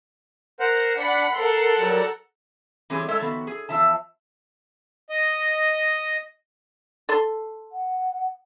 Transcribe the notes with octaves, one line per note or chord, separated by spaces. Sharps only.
A#4 C5 F#5
D4 F#5 B5 C#7
A4 A#4 F#5 C6
F#3 G3
E3 G3 C4 G4 G#4 C#5
G#3 A3 A4 C#5 E5
D#3 F3 B3 F#4
G#4
E2 F3 E5 A5
D#5
A4 C6
F#5